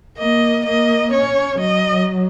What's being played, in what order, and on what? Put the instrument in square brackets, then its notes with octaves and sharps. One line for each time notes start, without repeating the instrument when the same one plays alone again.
[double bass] A#3 [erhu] D#5
[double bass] A#3 [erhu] D#5
[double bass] C#4 [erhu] C#5
[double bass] F#3 [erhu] D#5